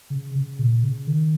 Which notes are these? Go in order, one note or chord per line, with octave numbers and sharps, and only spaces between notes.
C#3
C#3
A#2
C#3
D#3